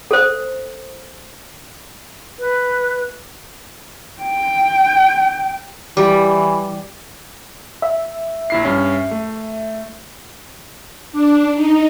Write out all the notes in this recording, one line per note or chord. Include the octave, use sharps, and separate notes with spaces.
A4 C5
B4
G5
E3 G3
E5
A#1 E4 C7
G2 C#4
A3
D4
D#4